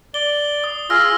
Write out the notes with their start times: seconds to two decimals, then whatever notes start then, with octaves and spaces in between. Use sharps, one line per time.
0.14 D5 G7
0.64 D#6
0.90 F4 G#4 E6 F6 A#6